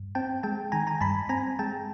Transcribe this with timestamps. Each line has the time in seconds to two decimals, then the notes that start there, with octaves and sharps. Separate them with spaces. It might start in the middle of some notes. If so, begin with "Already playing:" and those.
Already playing: G2
0.15 C4 G5 A5
0.43 G#3 G5 A5
0.72 D#3 G#5 A#5
0.87 G#5 A#5
1.01 G2 A5 B5
1.29 C4 G#5 A#5
1.59 G#3 G5 A5